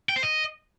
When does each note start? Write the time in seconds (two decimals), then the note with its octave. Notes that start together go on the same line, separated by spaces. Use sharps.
0.09 G5
0.16 C5
0.23 D#5